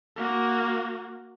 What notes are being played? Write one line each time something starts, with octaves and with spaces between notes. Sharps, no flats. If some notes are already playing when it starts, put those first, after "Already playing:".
A#3 F#4